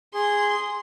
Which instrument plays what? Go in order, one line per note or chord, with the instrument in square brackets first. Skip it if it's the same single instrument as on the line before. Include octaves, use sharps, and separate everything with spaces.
[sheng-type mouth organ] G#4 [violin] C6